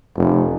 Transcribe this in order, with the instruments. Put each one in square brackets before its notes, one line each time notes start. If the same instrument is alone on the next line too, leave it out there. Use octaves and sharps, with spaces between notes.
[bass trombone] F1